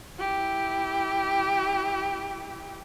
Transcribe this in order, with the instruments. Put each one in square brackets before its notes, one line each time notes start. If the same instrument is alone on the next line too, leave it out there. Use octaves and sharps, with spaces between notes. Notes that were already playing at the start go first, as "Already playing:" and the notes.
[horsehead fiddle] E4 G4